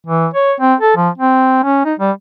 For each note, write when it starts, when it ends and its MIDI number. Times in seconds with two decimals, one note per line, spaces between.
0.07 0.27 52
0.34 0.53 73
0.60 0.74 60
0.80 0.95 69
0.97 1.09 53
1.18 1.63 60
1.64 1.85 61
1.85 1.94 63
2.00 2.11 55